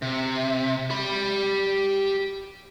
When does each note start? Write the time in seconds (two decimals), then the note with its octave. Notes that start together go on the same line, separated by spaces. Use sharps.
0.02 C3
0.90 G4 B5